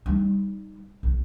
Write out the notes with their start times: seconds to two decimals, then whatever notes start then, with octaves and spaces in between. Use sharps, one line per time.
0.06 G3 D#4
1.03 B1